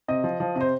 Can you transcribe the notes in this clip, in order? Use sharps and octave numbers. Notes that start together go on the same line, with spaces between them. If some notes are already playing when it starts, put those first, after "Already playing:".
C3 D#5
F3
F3
C3
C5